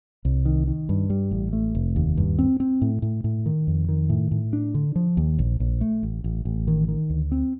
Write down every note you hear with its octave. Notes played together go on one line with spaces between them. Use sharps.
C2
D#3
D#3
G2
G3
A1
A3
F1
D#2
G2
C4
C4
A2
A2
A2
D#3
F2
D#3
A2
A2
D4
D3
F3
D#2
A#1
A#1
A3
A1
A1
A1
D#3
D#3
D2
C4